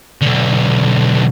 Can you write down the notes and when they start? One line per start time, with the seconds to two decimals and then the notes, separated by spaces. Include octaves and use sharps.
0.22 B1 D3